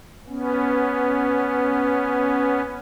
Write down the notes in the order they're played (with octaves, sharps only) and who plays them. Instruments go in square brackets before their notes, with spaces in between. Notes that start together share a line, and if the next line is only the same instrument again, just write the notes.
[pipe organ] B3 C#4